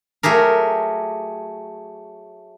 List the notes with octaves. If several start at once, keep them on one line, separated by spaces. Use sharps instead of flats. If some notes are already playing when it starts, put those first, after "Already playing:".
F#3 A3 G4 G#4 A#4